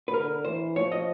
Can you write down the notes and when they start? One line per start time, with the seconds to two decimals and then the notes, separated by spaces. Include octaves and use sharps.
0.08 B4
0.14 D3 A#4
0.45 E3 C5
0.76 F3 C#5
0.92 D#5